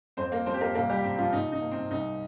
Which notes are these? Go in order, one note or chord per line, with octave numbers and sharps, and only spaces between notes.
F2 C4 C5
A#3 A#4
F3 C4 C5
G4
A#3 A#4
C2 A#3 A#4
G3 G4
C3 C4
F3 F4
A#2 D#4
D#4
A#3
C4
C2 D#4